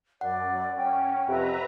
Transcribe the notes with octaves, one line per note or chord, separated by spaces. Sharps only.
F#2 D5 F#5
C#4 G5
F2 C3 B4 E5 A#5